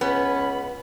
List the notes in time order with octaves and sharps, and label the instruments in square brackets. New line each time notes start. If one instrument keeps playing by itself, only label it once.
[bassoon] C#2 [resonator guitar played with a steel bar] B3 [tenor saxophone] C#4 [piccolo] B5